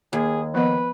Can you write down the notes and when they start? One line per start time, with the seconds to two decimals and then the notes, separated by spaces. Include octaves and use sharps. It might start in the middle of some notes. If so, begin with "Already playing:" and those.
0.13 D#2 G#4
0.54 F3 B3 B4 D#5